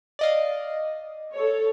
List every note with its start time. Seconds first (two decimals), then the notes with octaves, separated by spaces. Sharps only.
0.19 D5 D#5 F5
1.33 A4 C#5